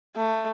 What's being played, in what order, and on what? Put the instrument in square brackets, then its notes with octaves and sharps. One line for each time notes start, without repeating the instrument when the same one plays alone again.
[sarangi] A3